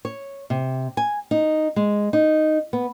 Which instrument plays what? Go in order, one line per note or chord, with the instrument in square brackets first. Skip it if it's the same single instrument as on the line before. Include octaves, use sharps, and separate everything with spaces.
[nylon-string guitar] C#5
C3
G#5
D#4
G#3
D#4
B3